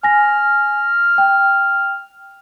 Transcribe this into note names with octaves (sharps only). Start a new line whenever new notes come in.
G#5 F6 A#6
G5